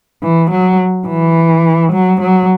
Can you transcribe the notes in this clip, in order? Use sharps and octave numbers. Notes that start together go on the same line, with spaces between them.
E3
F#3
E3
F#3
F#3